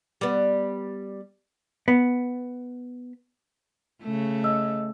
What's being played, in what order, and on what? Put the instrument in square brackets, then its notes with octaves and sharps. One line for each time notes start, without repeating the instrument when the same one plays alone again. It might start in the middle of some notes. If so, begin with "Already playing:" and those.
[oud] G3 B3
[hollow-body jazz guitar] B3
[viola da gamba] C#3 A3
[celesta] D#5 E6